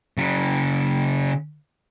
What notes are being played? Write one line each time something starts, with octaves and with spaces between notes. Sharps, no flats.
C#3 F#3